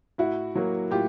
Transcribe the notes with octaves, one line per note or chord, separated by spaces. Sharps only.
A2 E4 F#4
F#3 A#3
A2 F4 G4